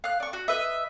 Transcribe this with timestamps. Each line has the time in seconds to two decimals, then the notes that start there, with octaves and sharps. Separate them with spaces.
0.04 F5 F#6
0.20 D5 C#6
0.33 F#4
0.48 B4 D#5 E5